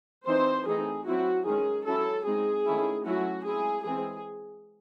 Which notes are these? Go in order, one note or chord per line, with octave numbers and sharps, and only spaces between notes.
E3 C4 D#4 C5
E3 A3 C4 D#4 G#4
F#3 C4 E4 F#4
D#3 G#3 C#4 G#4
F#3 C#4 E4 A4
G#3 C4 D#4 G#4
D#3 A3 C#4 E4
F#3 A3 C#4 E4 F#4
G#3 C4 E4 G#4
E3 G#3 C4 G#4